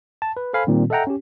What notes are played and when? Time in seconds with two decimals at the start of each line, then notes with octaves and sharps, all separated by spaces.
0.22 A5
0.37 B4
0.53 A4 C5 F5 G#5 B5
0.67 A#2 D#3 G3 C4
0.90 A4 D#5 E5 F#5 G5 A#5
1.07 C#4 G4